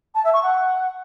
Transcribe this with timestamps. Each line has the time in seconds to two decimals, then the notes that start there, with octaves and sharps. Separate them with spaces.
0.14 A5
0.23 E5
0.33 C#6
0.42 F#5